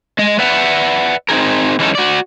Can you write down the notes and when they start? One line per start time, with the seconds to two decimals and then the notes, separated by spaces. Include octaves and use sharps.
0.19 G#3 D#5
0.39 B4 D5 E5 F#5
1.29 C4 D#4 G#4 A#4
1.79 E3 G#3 C#4 D#4 A4
1.95 F#4 D5